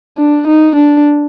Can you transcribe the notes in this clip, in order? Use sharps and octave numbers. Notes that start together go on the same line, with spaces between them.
D4
D#4
D4